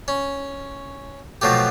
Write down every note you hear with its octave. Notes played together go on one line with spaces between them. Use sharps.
C#4
B2 F3 F#3 A3 G4